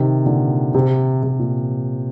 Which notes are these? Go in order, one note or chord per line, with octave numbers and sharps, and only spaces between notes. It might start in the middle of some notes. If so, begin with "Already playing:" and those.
Already playing: C3 D#3
A#2 D3
C3
C3
A#2